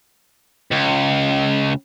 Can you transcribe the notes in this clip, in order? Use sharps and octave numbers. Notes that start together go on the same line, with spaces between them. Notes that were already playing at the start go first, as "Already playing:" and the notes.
C#2